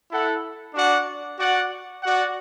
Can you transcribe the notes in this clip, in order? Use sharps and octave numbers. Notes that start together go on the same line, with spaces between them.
E4 A4 F#5
D4 F#4 D5 F#5
F#4 D5 F#5
F#4 D5 F#5